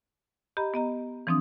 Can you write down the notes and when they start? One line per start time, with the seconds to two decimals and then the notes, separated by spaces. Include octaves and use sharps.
0.57 G4 D#5 A#5 B5
0.74 B3 D#5 A#5
1.27 E3 F3 C4 D4 D#6